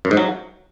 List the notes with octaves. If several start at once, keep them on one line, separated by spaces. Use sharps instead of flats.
F#2
G#2
F#3